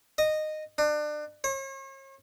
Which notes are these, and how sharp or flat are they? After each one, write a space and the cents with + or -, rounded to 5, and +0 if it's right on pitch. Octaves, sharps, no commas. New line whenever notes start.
D#5 -15
D4 +30
C#5 -40